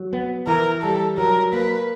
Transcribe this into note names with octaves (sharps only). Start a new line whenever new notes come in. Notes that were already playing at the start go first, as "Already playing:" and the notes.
Already playing: F#3
B3
E3 A#4
G3 A4
F#3 A#4
A#3 B4